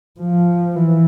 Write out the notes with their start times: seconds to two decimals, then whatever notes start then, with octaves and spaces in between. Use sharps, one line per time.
0.20 F3
0.76 E3